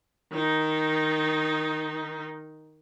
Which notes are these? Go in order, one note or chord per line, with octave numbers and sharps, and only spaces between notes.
D#3 D#4